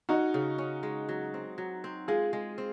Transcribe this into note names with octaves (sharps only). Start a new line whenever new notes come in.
C#4 D#4 F#4
C#3
C#4
G#3
F#3
C4
F#3
C4
G#3 F4 G#4
G#3
C4